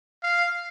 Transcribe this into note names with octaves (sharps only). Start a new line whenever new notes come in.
F5